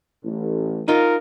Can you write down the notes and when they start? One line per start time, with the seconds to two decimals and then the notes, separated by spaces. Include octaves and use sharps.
0.23 A1
0.88 D#4 F4 A#4